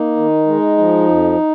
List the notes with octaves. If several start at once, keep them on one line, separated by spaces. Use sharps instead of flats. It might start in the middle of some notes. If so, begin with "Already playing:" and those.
Already playing: A#3 D#4
D#3
G#3
F3
F2